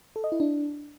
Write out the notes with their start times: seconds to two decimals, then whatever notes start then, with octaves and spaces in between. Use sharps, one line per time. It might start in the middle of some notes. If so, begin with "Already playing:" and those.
0.16 A4
0.24 D#5
0.32 E4
0.40 D4